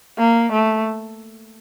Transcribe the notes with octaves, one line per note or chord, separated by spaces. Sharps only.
A#3
A3